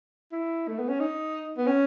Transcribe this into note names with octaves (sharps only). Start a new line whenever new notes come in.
E4
A3
B3
C#4
D#4
B3
C#4